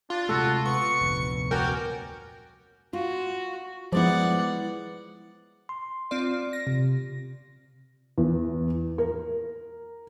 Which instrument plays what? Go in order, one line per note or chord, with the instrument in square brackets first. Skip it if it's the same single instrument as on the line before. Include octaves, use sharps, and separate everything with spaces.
[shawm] D4 [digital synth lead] F4
[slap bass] C3 G#3 A3 [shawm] F#4 [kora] A4
[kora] B3 [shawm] C#6 [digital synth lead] C#7
[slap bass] F1 D2 A#2
[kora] C#4 F#4 D5 [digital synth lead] A#4 [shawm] G5
[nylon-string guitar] F4 [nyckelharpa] F#4
[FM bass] F3 [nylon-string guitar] G#3 B3 E4 [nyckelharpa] D5 F#5
[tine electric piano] C6
[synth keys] C4 F4 D5
A#6
[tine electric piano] C3
[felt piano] E2
A#4